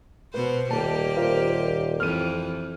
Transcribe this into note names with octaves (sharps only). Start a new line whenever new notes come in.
B2 B4 C5
D#1 A#3 G4 A5
F4 A#4 C5
F2 E3 F6 D#7